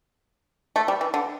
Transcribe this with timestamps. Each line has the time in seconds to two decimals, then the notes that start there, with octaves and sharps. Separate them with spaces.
0.76 A3
0.88 G3
1.01 E3
1.14 D3